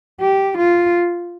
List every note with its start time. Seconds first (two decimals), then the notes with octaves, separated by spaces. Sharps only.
0.20 G4
0.58 F4